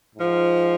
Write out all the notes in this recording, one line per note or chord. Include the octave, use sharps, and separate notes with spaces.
G#2 F3